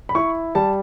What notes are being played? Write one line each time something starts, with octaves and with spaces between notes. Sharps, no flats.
B5
E4 C#6
G3 A5